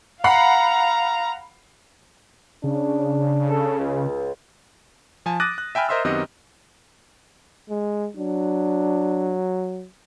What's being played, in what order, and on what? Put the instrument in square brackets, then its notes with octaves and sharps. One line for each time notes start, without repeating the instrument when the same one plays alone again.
[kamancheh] F5 A#5 [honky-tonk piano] F#5 B5 C7
[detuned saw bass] C#3 [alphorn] D4
[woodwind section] A4
C#2
[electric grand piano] F3 G#5 A5
D6 D#6 F#6 A6 A#6 D#7
F#6
E5 G5 G#5 B5 F6
A#4 C5 D#5 E5 C6 E6
F#2 D#3 B3 C4 G4 D#5
[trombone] G#3
[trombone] F#3 [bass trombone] D4